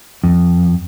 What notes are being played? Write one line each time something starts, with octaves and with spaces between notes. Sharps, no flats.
F2